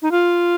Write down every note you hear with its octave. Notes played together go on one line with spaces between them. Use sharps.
D#4
F4